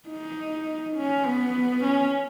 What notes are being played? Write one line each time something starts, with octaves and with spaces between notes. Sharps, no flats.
D#4
C#4
B3
C#4